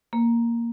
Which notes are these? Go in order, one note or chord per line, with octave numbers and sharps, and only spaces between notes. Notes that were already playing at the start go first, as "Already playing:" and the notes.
A#3